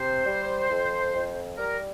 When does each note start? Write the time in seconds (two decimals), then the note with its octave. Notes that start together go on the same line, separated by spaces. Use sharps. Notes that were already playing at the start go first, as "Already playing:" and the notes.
Already playing: C3 C5
0.26 G3
0.70 F2
1.14 F2
1.58 G3 A#4